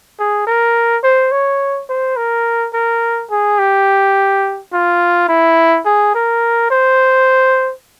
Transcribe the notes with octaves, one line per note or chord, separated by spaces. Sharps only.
G#4
A#4
C5
C#5
C5
A#4
A#4
G#4
G4
F4
E4
G#4
A#4
C5